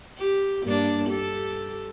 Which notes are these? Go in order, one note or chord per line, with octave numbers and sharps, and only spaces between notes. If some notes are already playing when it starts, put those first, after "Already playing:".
G4
G2 A#3 D4
G4 A4